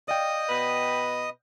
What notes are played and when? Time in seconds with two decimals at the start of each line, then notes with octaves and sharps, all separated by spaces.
0.08 D5 D#5 F5 G5 D#6
0.49 B2 B4